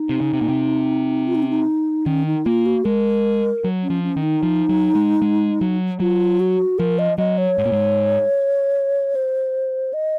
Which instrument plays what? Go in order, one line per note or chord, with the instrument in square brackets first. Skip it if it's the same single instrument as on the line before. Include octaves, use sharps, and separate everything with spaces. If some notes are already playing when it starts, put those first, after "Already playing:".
Already playing: [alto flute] D#4
[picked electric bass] C3
C#3
C3
A#2
C3
[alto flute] F4
D#4
C#4
D#4
[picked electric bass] D#3 [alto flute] C#4
[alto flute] D#4
[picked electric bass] A#3 [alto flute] F4
[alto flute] F#4
[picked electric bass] G#3 [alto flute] A#4
[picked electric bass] F#3
[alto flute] C#4
[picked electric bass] F3
[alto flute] C#4
[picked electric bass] D#3
[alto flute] D#4
[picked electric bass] F3
F#3
G#3
G#3
F#3
[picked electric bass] F#3 [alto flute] F4
[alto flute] F#4
[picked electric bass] F3 [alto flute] A#4
[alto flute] D#5
[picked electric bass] F#3 [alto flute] D#5
[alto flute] C#5
[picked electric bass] G#2
A#2
G#2
[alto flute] C5
D#5